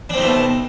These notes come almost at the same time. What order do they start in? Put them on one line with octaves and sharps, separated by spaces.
D4 C4 D#4 A3 B2